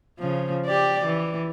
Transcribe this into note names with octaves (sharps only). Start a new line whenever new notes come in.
C#3 F3
G4 D5
E3